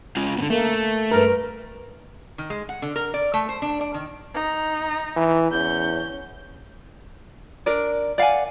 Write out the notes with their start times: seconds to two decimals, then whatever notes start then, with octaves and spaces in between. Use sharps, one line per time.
0.17 G#3 C#4 F4
0.39 D3 B3
0.50 A3 A#3
1.11 G2 A#4 B4
2.38 D#3
2.50 G#3
2.69 F#5
2.82 D3
2.96 A#4
3.14 D5
3.34 A3
3.49 C5
3.62 D4
3.81 D5
3.94 D#3
4.34 D#4
5.16 E3
5.51 E2 C#4 G6
7.66 D4 A#4 D5
8.18 D5 F5 F#5 G#5